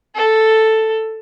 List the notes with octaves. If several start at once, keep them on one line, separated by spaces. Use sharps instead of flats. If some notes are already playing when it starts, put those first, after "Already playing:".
A4